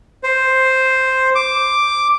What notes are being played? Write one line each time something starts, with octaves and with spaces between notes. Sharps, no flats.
C5
D6